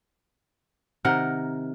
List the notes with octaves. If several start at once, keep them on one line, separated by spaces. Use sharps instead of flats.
C3 D#3 A#4 F#5